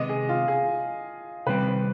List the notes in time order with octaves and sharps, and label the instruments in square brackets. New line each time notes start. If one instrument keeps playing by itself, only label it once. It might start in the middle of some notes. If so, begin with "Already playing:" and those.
Already playing: [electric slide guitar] C3 D#3 G#3 B3 [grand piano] D#5
[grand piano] G#4
F4
G#4
[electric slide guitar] C3 D#3 G3 C4 [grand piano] B4
[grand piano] C5